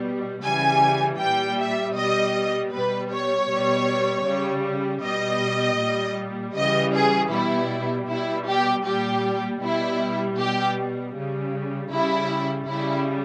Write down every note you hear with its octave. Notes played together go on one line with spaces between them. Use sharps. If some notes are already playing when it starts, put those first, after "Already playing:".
Already playing: B2 G3
C#3 E3 G3 G#5
A#2 G3 G5
E5
B2 G3 D#5
B2 G3 B4
C#5
B2 G3
C#3 G3
B2 G3 D#5
A#2 G3
C#3 E3 G3 D#5
G#4
B2 G3 E4
B2 G3 E4
G4
A#2 G3 G4
B2 G3 E4
B2 G3 G4
C#3 G3
C#3 G3 E4
C#3 G3 E4